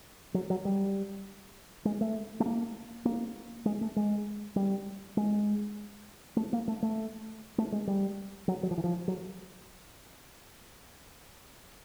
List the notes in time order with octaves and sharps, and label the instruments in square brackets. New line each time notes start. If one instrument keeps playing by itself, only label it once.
[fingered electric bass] F#3
F#3
G3
G#3
A3
A3
A#3
A#3
G#3
A3
G#3
G3
G#3
A3
A#3
A3
A3
A3
G#3
G3
F#3
F#3
F3
E3
F3
F#3